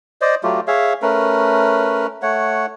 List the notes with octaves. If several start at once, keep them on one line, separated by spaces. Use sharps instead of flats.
C5 D5 D#5
F#3 A3 F4 G4
G#4 C#5 E5 F5
A3 C#4 A#4 B4
A3 C#5 F#5